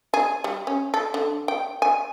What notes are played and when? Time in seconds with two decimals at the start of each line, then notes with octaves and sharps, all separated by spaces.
0.14 G#4
0.44 G3
0.67 C#4
0.94 A4
1.14 D3
1.48 G5
1.82 G#5